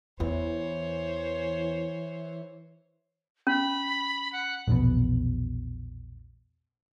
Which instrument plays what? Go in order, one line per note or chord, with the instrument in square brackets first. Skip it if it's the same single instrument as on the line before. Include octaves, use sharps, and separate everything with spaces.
[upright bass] E2 [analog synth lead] E3 [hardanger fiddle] C5 C#5
[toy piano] C#4 [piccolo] B5
[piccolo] F#5
[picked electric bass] A#1 E2 B2 B3